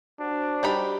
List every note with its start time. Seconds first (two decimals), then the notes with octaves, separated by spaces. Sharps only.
0.20 D4 F#4 C5
0.63 G3 D#4 G4 B5